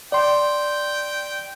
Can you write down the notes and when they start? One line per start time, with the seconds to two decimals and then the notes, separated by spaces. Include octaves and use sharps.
0.12 D5 G5 C6